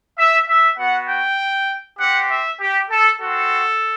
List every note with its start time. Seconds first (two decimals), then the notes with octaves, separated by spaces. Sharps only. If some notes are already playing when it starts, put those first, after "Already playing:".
0.18 E5
0.48 E5
0.78 B3 F#4 F#5
1.09 G5
1.99 C4 G4 F#5
2.30 E5
2.60 G4
2.90 A4
3.20 C4 F#4 A4